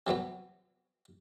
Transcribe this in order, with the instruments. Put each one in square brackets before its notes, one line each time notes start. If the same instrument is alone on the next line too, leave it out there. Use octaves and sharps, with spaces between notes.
[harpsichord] C3 E3 F#3 B3